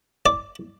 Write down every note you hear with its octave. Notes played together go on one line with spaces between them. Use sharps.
D5